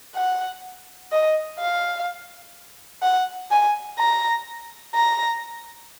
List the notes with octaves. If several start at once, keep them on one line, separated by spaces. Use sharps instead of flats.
F#5
D#5
F5
F#5
G#5
A#5
A#5